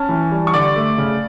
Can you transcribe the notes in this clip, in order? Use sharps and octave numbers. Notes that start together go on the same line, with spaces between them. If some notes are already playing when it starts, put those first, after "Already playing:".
Already playing: C#4 A5
E3
G3
C#6
D3 D5 D6
A3
C#3